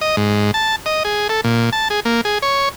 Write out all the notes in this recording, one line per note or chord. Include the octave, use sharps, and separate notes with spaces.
D#5
G#2
A5
D#5
G#4
A4
A#2
A5
G#4
A#3
G#4
C#5